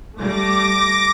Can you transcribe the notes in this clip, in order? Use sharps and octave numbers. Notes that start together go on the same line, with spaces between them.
G3 A3 D6 A#6